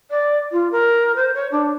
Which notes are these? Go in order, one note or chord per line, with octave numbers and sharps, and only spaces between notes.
D5
F4
A#4
C5
C#5
D4